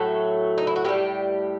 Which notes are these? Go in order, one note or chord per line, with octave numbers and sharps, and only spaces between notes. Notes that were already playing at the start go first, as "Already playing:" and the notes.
Already playing: A2 F#3 A3 A4
D#4
E4
F#4
A2 E3 G3 G4